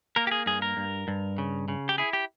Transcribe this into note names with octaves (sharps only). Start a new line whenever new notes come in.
A#3 A#4
G4
G#4
G2 G#4
A#4
G2
G2
C#3
C#3
G4
E4 G#4
G4